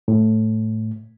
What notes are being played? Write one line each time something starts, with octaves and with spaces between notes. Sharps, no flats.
A2